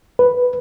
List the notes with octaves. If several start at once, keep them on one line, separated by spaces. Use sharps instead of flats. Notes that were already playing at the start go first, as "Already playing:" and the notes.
B4